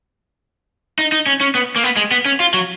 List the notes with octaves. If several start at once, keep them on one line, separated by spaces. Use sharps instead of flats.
D#4
D#4
C#4
C#4
B3
A#3
B3
G#3
B3
C#4
F4
F#3